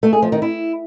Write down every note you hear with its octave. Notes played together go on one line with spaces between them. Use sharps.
A3
G#4
F3
D#3
E4